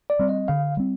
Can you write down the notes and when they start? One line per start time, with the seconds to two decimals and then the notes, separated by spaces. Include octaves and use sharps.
0.10 D5
0.19 G3 C4
0.29 D#5
0.48 D3 F5
0.77 G3 C4